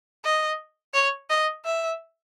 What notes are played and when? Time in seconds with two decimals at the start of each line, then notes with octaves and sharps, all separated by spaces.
0.24 D#5
0.94 C#5
1.30 D#5
1.65 E5